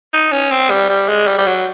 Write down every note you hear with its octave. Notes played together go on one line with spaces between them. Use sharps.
D#4
C#4
C4
G3
G3
G#3
G3
G3
F#3